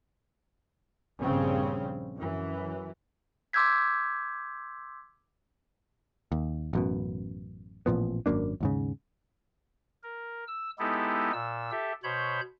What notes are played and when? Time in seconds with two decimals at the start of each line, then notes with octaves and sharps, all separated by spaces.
1.20 A#1 G2 C#3 C4 C#4
2.15 F#2 E3
3.53 C6 D6 E6 G6 G#6 B6
6.32 D#2
6.73 A1 F#2 B2
7.86 A1 A#2 F3 B3
8.26 G#1 F#2 A#3 D4
8.61 D#2 G#2 C#3
10.03 A#4
10.48 E6
10.79 G#3 B3 D#4 E4 G4 A4
11.33 A#2 E6
11.71 G4 A4 E5
12.03 B2 C5 C#5 B5 G6